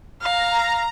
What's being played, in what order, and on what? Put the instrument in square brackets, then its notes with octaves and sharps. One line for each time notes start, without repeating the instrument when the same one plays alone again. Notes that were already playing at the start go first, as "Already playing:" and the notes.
[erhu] F5 [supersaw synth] A#5